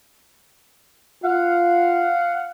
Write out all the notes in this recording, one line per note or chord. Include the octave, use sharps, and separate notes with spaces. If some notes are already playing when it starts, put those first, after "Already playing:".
F4 F5 F#5